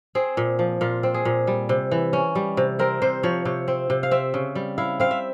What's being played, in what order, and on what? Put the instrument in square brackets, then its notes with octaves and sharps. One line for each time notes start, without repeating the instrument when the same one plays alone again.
[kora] C4 G#4
A#2
F3
A#2 F4
C4
G#4
A#2
G3
C3
E3
C#4
G3
C3
C4 A#4
C3 C5
F3 C#5
C3 C#5
C4
C3
F5
C4 E5
C#3
G3
E4 F5
C4 F5
E5